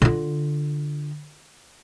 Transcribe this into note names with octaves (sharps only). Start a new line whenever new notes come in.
D3 F4